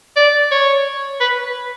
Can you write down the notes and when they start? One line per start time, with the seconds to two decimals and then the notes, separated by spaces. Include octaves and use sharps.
0.16 D5
0.51 C#5
1.20 B4